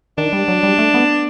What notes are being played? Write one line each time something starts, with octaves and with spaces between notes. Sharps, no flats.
D#3 D4
G3
F#3
G3
A3
B3